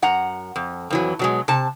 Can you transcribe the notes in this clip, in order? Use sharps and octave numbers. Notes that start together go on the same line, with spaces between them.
F#2 F#5 A#5
F2
F2 E3 F#3
B2 F#3 G#3
C3 A5